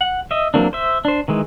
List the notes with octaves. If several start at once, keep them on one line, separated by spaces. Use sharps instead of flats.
F#5
D#5 E5
E3 F#3 A#3 C4 D4
C5 E5
D4 C5
D#3 E3 G#3